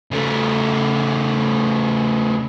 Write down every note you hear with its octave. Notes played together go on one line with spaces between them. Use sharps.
C#3 A3